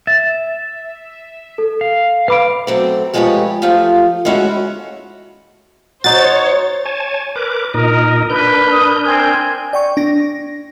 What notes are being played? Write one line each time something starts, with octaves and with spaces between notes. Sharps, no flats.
E5 A6
A4
F5
B4 F5 B5 D6 D7
F#3 A3 C4
F3 G#3 A3 G4 B4 C#5
F3 A3 F4 G4
G#3 A3 C#4 E4 F#4
D#4 F#4 C5 C#5 A6
C#5 G#5 A5
A#4 B4 D6
A#2 D#4 A#4 D#5
D4 A#4 B4 G6
D#6
C4 G#5
D5 G5 C#6
D4 A#6